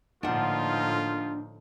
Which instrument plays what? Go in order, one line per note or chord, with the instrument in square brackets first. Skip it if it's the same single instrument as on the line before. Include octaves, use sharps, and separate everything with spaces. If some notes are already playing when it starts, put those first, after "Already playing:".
[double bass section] A2 D3 A#3 [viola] F3 D#4 [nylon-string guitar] D4 F#5 [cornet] F4